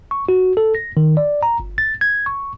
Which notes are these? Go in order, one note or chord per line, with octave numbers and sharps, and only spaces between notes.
C#6
F#4
A4
A#6
D#3
D5
A#5
G1
A6
G#6
C#6